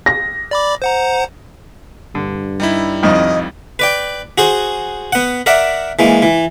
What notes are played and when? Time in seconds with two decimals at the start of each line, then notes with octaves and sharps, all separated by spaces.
0.06 A#6
0.51 D5 B5 D6
0.82 C5 F#5 A#5
2.15 G2 D3
2.60 G3 D#4 E4
3.03 C2 F2 D#3 D#5
3.79 B4 D5 G5
4.38 F#4 G#4 C5
5.13 B3 F#5
5.46 A#4 D5 E5 F#5
5.99 E3 G#3 A#3
6.22 E3